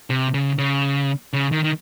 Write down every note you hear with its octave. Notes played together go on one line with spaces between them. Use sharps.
C3
C#3
C#3
C#3
D#3
D#3